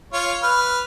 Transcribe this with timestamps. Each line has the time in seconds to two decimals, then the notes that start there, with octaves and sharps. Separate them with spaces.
0.13 F4 C#5
0.43 B4 F6